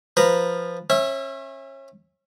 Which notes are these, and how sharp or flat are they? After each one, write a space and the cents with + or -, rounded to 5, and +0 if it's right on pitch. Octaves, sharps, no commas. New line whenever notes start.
F3 +0 B4 +0 A#5 +0
C#4 -35 E5 +0